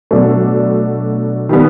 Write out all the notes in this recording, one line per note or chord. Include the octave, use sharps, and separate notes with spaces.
B2 F#3 A3 D4
D#3 G3 B3